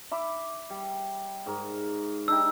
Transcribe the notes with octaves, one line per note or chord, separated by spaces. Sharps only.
E5 B5 D6
G3
G#2 A#4
D4 D#4 G4 E6